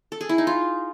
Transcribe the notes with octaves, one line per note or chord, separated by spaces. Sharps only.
A4
G#4
E4
D#4
F4